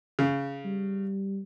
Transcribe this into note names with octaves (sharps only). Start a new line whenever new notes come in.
C#3
G3